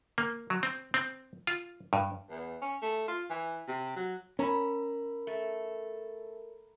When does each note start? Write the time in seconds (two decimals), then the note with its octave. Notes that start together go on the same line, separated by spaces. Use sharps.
0.18 A#3
0.50 F#3
0.63 C4
0.94 C4
1.47 F4
1.93 G2
2.30 E2
2.62 C#4
2.82 A3
3.08 F4
3.30 E3
3.67 C3
3.96 F#3
4.39 C#4 A#4 A#5 B5
5.27 A3